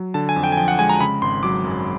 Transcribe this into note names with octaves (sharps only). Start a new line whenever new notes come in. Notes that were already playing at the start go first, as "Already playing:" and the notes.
Already playing: F#3
D3 A5
G#5
F2
G5
G#5
F3 G5
F#5
G#3 G#5
A#5
C#3 B5
G#1 C6
F#3 D6
F#2